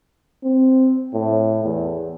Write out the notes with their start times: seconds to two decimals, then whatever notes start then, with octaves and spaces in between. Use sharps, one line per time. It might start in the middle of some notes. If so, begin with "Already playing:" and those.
0.44 C4
1.14 A2
1.64 E2